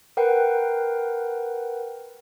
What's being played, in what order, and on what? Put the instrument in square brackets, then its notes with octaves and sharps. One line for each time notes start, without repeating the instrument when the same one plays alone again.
[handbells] A#4 B4 F#5 G5